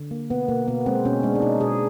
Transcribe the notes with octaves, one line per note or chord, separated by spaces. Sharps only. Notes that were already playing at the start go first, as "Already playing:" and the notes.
Already playing: D3
A#3
B2 B3
B2 A#3
B2 B3
G#3 C4
B2 C#4
G#3 D4
D4
B2 D#4
B2 G#4